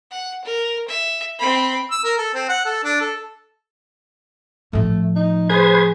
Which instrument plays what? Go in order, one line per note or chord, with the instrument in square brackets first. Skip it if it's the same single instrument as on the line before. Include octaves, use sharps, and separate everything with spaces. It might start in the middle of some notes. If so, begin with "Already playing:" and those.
[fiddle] F#5
A#4
E5
C4 B5
[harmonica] E6
A#4
A4
C4
F#5
A4
D4
A4
[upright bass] A2 F3 [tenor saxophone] A3
[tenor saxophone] D#4
[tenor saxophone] G#4 [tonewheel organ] B4 C5 G#6